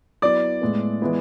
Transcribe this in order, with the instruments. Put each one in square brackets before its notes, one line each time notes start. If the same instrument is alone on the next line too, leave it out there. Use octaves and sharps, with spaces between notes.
[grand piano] F#3 B3 E4 [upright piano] D5
[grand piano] A2 G#3 B3
E3 G#3 B3 E4